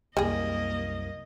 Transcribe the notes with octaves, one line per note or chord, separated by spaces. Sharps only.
C2 F#2 G3 A#3 G#4 D#5